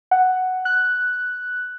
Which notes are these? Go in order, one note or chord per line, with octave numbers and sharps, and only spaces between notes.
F#5
F#6